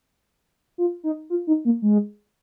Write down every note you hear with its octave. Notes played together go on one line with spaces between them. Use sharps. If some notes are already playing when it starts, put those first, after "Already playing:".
F4
D#4
F4
D#4
A#3
G#3